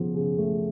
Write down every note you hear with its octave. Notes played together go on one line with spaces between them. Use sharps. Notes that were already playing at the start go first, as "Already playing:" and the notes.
Already playing: C#3 F3 B3
C#3
A3